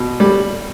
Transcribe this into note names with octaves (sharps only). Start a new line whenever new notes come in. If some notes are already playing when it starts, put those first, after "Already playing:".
Already playing: B2
G3